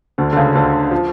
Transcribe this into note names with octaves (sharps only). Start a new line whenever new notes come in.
D2 D3
D3
C#2 C#3
D2 D3
F3